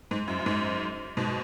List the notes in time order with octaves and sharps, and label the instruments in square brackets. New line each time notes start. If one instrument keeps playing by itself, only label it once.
[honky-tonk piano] G#2
F#2
F#2
G#2
G#2 B2